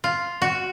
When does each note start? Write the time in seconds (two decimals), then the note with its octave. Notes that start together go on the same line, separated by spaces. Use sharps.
0.04 F4
0.42 F#4